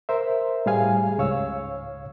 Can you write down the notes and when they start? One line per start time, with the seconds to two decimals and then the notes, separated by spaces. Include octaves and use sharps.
0.09 A#4 C5 E5
0.66 A2 G3 G#4 F5 G#5
1.18 C#2 G#2 C#5 F5 E6